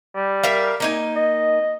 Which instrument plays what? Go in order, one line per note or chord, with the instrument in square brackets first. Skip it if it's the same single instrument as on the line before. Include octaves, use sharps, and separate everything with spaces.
[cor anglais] G3
[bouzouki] A#4 E5 F5
A#3 D#4 G#5
[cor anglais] D#5